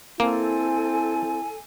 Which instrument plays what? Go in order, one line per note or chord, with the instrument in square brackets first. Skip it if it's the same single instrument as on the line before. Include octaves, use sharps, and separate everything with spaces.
[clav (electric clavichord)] A#3 [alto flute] C4 [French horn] E4 [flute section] A4 G#5